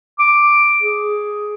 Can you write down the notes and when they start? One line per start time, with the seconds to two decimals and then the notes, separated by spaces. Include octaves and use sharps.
0.19 D6
0.83 G#4